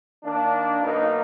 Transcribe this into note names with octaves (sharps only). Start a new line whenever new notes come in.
D#3 A#3 D4
B1 B2 A#3 D#4